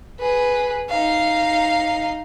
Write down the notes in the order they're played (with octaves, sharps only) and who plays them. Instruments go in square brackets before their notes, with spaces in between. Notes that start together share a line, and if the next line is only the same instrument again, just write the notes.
[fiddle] G#4 B4
D#4 F5